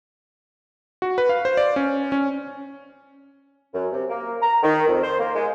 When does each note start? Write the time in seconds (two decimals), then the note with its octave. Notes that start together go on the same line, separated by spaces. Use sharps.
1.02 F#4
1.18 B4
1.29 F5
1.45 C5
1.57 D5
1.76 C#4
2.12 C#4
3.73 F#2
3.92 C3
4.09 A#3
4.42 A#5
4.62 D#3
4.87 F2
5.02 C5
5.19 A#3
5.35 G#3